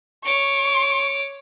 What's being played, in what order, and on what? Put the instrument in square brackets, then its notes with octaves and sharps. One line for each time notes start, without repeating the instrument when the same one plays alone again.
[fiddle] C#5 D6 [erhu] C#6